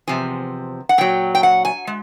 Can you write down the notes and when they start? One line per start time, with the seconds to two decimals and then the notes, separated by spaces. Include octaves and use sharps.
0.08 E2 C3 F3 G#5
0.89 F#5
0.98 A#2 F#3 G5
1.35 G5
1.43 F#5
1.65 G#5
1.87 G#3